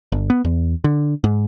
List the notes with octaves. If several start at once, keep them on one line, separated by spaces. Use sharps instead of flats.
G1
B3
E2
D3
G#2